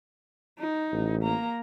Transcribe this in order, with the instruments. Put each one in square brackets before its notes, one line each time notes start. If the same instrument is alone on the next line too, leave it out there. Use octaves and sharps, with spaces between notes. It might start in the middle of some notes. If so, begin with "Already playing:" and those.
[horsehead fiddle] D#4
[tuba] A1
[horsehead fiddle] A#3 A#5